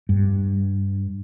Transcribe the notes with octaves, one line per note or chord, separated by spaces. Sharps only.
G2